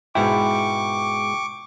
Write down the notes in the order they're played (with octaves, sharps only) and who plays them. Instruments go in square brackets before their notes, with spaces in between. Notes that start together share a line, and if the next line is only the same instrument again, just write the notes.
[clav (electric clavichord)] G#2 B2 E4 [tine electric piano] G5 [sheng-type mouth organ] C#6 D6